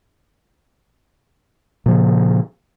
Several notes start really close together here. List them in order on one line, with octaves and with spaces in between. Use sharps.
A#2 F3 C#3